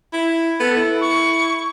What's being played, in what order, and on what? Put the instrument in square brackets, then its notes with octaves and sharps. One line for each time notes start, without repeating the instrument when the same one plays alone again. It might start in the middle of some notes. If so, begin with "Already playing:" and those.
[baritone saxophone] E4
[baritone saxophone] B3 [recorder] A4
[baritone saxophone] E4
[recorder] C#6